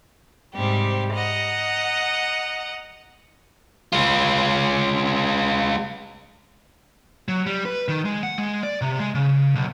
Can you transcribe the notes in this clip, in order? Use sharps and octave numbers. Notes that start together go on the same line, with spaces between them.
G#2 C3 G3 G4
D#5 F#5 A#5
G#3 F4
F#3
G3
B4
D#3
G#3
F#5
G#3
D5
C3
G#3
C#3
B1